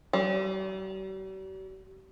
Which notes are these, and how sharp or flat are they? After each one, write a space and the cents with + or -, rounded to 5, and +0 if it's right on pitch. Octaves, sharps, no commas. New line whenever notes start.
G3 -45